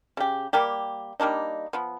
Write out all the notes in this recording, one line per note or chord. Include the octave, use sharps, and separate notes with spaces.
C#3 G4
G3 A#3 G4
G3 A#3 D4 D#4
F3 B3